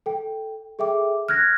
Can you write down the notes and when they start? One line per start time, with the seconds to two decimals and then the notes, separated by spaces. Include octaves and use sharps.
0.06 A4 G5
0.79 G#4 A4 E5 G5 D6
1.29 F6 F#6 G#6 A#6